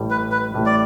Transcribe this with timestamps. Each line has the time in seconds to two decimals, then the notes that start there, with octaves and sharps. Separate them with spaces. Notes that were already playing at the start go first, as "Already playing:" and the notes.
Already playing: A1 A2 G3
0.11 B4
0.32 B4
0.54 A1 A2 G3
0.66 D5